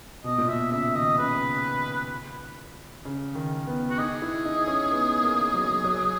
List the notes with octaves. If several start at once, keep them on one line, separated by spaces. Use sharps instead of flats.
B2 D#5
A#2
B2 E5
C#3 E5
D#3 D#5
C#3 B4
C#3
D#3
B3
F#4
D#4 G#4
E4
D#4
C#4
B3
A#3
F#3
F#3